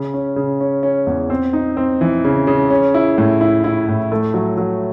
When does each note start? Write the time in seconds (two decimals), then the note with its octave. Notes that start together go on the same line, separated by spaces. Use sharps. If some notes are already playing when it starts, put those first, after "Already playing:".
Already playing: C#3
0.14 C#4
0.36 C#3
0.61 C#4
0.83 C#4
1.07 E2
1.30 C4
1.53 D#4
1.77 C4
2.01 E3
2.24 C#3
2.47 C#3
2.70 C#4
2.94 E4
3.18 A2
3.41 E4
3.64 E4
3.88 A2
4.12 A3
4.34 F#3
4.58 F#3